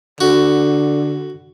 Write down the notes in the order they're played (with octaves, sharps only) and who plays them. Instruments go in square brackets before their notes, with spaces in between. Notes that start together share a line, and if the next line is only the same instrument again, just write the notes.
[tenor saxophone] D3 [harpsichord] F#4